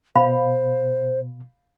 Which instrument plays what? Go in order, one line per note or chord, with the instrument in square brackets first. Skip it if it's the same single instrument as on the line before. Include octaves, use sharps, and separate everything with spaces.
[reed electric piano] B2 [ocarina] C5 [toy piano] F5 B5